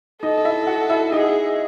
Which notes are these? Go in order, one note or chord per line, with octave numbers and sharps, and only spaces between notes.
D#4 A4 D#5
D#5
E4 E5
F#4 F#5
E4 E5
D#4 G#4 D#5